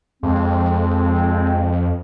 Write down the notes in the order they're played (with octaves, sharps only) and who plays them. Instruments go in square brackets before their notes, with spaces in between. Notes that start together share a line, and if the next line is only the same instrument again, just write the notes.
[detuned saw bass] F2 [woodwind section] G#3 C4